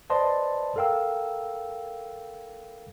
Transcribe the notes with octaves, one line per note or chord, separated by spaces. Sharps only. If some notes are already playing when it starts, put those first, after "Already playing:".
B4 C5 D5 D#5 A5 C6
A4 A#4 F5 G5 E6